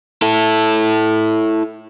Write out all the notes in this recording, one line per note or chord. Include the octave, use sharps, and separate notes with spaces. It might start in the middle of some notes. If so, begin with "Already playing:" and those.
E4 A4